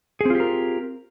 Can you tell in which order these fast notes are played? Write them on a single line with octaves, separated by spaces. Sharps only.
G#4 C4 F4 G4 A#4